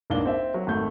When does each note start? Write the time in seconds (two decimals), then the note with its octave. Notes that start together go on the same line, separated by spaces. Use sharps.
0.10 B1 G#2 A#3 D4 G7
0.25 C4 E5
0.54 F#3
0.67 G#1 A3 G6